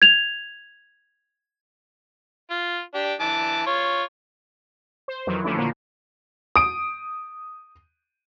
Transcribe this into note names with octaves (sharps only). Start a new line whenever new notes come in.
G#6 F7
F4
D4 G4
E3 A5 D6
F4 C#5
C5
F2 D#3 E3 F#3
D3 F3 A3 C#4 D4 E4
A#2 D3 F3 A#3
D#6 D7